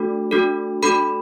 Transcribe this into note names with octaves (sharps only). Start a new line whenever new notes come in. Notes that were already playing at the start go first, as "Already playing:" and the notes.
Already playing: A3 D4 F#4 A4
A3 D4 F#4 A4
A3 D4 F#4 A4 B5